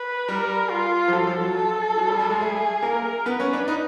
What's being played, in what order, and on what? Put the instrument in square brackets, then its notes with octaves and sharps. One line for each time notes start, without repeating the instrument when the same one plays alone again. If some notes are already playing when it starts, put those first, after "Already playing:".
Already playing: [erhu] B4
[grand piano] G3 [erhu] A#4
[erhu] F4
[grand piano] F3
[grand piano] F#3 [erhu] A4
[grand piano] F3
F#3
[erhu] A4
[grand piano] F#3
G3
G3
G#3
[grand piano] A3 [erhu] G#4
[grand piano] A#3 [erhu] A#4
[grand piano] B3 [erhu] B4
[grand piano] C#4
D4
D#4